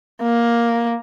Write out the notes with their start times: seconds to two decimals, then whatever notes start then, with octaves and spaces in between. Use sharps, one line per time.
0.22 A#3